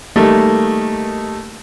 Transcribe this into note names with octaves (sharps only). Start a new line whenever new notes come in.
D#3 G3 A3 A#3